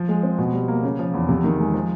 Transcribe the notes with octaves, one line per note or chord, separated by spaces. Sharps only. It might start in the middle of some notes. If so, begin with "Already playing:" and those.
Already playing: F3
G#3
C4
B2
G3
A#3
C#3
F3
E2
C3
D#3
G#3
F3